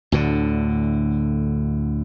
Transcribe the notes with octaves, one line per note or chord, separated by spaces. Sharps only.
D2 A2 D3